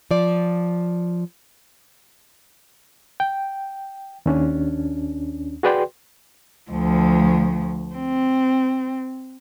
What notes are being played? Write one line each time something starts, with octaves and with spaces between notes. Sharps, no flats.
F3 D5
G5
D#2 C#4 D4
F#4 G#4 B4 D5 G5 C6
D2 F3
C4